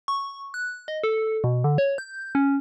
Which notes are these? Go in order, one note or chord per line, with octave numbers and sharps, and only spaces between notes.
C#6
F#6
D#5
A4
B2
D3
C#5
G6
C#4